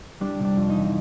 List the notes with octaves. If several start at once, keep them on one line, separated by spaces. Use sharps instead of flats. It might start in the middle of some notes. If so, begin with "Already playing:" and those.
G3 D4
C3
D4
F2
D#4
E3